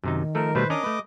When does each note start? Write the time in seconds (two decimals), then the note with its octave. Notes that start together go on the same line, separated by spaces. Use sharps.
0.04 F#2 C3 D#3 D#4
0.35 F3 A3 A4 A#4
0.55 B2 G3 A3 B4 C5
0.70 C#4 D4 A#4 D#5 D6 D#6
0.84 A3 B4